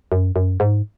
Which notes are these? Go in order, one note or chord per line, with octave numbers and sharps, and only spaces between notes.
F#2
F#2
G#2